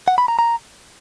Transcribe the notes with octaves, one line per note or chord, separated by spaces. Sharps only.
F#5
B5
A#5
A#5